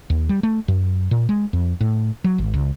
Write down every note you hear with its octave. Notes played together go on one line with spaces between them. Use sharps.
D#2
G3
A3
F#2
A#2
G#3
F2
A2
F#3
G#1
C#2